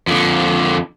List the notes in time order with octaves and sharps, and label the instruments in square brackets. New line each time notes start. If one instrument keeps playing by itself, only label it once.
[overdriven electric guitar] F2 D3